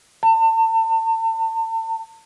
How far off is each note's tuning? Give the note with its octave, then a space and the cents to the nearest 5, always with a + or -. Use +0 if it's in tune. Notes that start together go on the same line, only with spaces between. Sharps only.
A5 +40